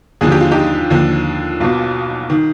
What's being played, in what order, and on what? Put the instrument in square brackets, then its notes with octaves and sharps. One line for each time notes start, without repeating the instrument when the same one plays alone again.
[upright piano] D#2 D3 F3 G#4
G4
F4
D#4 G4
D#2 D3 F3
B1 B2 F4
D#3